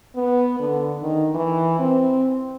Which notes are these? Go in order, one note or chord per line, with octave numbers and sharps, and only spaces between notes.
B3
D3
D#3
E3
C4